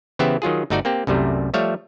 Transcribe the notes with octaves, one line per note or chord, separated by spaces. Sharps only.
C#3 E3 B3 G4 C5 E5
D#3 F#3 F4 G#4
G1 A3 D#4 F#4 D5
A#3 C4 G4
C2 F#2 C3 G3 A3
F3 G3 A3 C#5 E5 F5